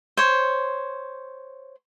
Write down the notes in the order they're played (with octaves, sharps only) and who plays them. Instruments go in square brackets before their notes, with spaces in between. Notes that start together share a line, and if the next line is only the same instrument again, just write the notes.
[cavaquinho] C5 C#5